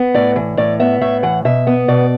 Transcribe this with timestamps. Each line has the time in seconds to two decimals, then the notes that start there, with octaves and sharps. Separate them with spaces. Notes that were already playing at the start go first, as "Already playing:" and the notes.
Already playing: B3
0.14 A2 D5
0.36 E3
0.57 A2 D5
0.80 B3 E5
1.01 A2 E5
1.23 E3 F#5
1.45 B2 E5
1.67 B3
1.88 B2 D5